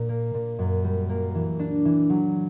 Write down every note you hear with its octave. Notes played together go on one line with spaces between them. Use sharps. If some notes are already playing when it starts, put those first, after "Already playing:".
Already playing: A#2
A#3
A#2
F#2
G3
A#3
E3
D4
E3
F#3